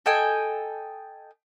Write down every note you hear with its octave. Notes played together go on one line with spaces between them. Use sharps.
A4 D#5 G5 G#5